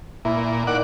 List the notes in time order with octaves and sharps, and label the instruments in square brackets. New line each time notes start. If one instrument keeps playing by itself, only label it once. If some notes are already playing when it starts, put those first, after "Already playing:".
[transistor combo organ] A#2 [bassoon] E4
[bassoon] D#3 [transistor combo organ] D5 F#5